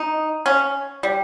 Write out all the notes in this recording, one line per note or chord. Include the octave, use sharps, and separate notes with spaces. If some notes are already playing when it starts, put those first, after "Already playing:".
Already playing: D#4
C#4
G3